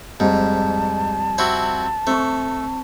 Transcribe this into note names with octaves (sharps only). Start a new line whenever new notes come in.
F2 G#2 G3 A5
C4 E4 F#4
A3 C4 C#6